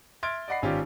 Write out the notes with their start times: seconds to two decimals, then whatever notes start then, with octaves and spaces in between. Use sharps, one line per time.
0.23 E5 C6 F6 G#6 A6 D7
0.48 D5 D#5 F#5 B5 C7
0.62 G#1 C#4 F4 G4 D5